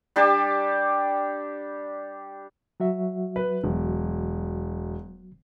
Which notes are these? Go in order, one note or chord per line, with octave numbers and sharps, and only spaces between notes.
G3 D4 G4 A5
F#3 F#4 E5
B4
E1